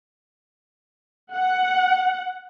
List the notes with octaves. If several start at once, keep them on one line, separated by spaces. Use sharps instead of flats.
F#5